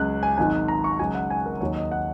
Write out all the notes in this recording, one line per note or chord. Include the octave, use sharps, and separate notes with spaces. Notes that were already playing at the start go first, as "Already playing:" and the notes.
Already playing: C#2 C#3 F#3 F#6
G#5
G#1 G#2 D#3 F#3 G#5
A#5
C#6
C#2 C#3 F#3 G#5
F#5
G#5
A#4
D#2 D#3 F#3 C#5
D#5
F#5